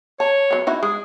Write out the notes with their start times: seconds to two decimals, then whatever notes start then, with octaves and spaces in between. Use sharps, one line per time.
0.20 C#5 A5
0.51 F#3 B3
0.67 D#4 E4 F#4
0.83 G#3 G#4